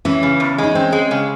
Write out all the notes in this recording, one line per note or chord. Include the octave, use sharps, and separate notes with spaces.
E3 C#4
C#3
E2
G#3
D#4
C4 C#4
G#3
C#3